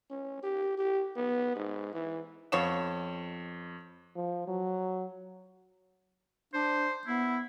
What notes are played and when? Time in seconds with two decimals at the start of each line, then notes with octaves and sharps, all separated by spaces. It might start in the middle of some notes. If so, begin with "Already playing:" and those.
0.11 C#4
0.43 G4
0.78 G4
1.16 B3
1.56 G#2
1.94 E3
2.52 F2 B3 F4 C#5 C#6 E7
4.15 F3
4.47 F#3
6.54 D4 C5
7.07 B3 E4